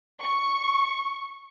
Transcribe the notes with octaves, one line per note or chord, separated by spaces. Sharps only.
C#6